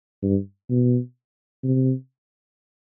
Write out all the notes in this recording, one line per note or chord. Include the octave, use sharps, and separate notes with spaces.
G2
B2
C3